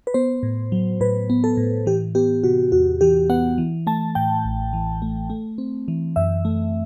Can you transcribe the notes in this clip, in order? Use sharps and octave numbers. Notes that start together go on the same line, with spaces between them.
B4
B3 C5
A2
F#3
A2 B4
B3
A4
A2
E3 G4
B3 G4
C3 F#4
E2 F#4
E3 G4
B3 F#5
E3
A3 A5
A2 G5
A1
E3
A3
A3
C4
E3
F#2 E5
A3